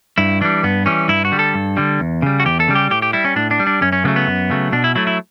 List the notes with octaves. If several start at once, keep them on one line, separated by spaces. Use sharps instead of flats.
G2 E4
E3 G3 D4
G2 B3
E3 G3 C#4
G2 E4
F#4
D3 G3
A4
G2
D3 G3
E2
C#3 G3
F#4
E2 G4
A4
C#3 G3
G4
A2 G4
G4
G3 E4
C#4
A2 D4
D4
G3
D4
F#2 C#4
C#4
C#3 F#3 A3 B3
B3
F#2
C#3 F#3 A3
B2 D4
E4
F#3 A3 E4
E4